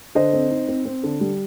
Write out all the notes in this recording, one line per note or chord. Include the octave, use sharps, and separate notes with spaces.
D3 C5 D#5
C4
D#4
C4
C4
D3
G3